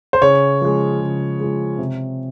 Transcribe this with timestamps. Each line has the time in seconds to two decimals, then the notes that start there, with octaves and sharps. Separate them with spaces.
0.13 C5
0.21 C#3 C#5
0.61 F3 G#3
1.00 C#3
1.40 F3 G#3
1.78 C3